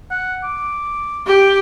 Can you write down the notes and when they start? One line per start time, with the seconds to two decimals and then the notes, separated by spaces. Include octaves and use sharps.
0.11 F#5
0.44 D6
1.27 G4